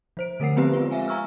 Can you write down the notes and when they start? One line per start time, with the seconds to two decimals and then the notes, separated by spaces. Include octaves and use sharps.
0.17 F3 C5 D7
0.40 D3 A3 A#4 F#5 C7
0.56 F3 B3 C4 G4 B4 C5
0.73 G#3 C4 F4
0.91 E5 F5 G#5
1.08 G#5 A#5 C#6 E6 F6